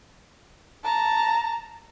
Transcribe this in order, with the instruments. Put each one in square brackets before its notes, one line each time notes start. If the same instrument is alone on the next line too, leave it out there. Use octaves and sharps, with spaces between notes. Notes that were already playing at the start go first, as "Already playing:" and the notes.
[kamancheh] A5 A#5